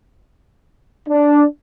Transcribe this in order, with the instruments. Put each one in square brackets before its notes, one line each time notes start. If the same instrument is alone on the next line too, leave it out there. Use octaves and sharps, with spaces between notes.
[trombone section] D4